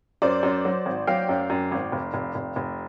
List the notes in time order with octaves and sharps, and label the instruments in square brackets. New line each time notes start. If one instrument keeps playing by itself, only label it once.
[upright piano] F#2 [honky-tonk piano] C5 D5
[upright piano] F#2
F#3
G#1
[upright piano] F#3 [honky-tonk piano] F5 G5
[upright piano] F#2
F#2
G#1
F1
F1
F1
F1